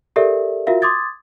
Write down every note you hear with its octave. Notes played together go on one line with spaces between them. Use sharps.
G4 A4 A#4 D5 E5
F4 F#4 A#4 E5 F5
C6 D6 D#6 G#6 A6